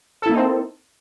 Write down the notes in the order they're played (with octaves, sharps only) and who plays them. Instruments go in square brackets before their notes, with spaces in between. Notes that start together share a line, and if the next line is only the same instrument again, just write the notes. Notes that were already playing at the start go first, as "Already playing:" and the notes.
[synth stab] A4
E4
A#3
D#4
C4